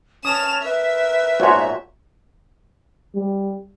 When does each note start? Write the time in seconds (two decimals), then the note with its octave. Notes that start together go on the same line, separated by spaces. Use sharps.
0.25 C#4 A5 D#6 F6 E7 F7
0.63 A#4 B4 E5
1.40 A#1 G#2 F4 F#4 C#5
3.15 G3